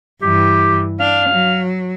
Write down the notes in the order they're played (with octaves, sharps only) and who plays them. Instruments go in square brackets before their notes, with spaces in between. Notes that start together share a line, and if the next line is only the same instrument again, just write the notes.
[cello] G2 E3 [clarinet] G4
[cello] D4 [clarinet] F5
[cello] F#3